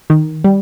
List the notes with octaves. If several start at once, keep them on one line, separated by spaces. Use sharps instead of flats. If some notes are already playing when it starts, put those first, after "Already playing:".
D#3
G3